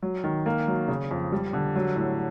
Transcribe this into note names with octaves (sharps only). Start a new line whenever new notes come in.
F#3
D#3
A#3
F#3
C#3
F2
G3
D3
F#3
A2